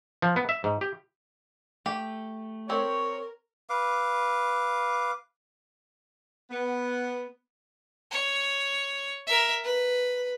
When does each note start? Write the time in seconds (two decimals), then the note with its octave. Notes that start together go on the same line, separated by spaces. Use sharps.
0.22 F3
0.36 B3
0.49 E5
0.64 G#2
0.81 G4
1.86 A3 G4
2.69 C4 G4 A#4 C#5
3.70 B4 F5 D6
6.51 B3
8.11 C#5
9.27 A#4 E5
9.64 B4